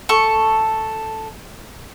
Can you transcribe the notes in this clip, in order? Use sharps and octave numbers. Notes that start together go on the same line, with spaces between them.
A4 C#6